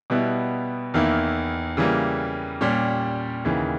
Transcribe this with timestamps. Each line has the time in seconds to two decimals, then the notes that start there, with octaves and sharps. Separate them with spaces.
0.10 B2 G3 B3 E4
0.94 E2 D#3 A#3 E4
1.77 C#3 E3 G3 A#3
2.61 A#2 G3 C#4 G4
3.44 D#2 C#3 E3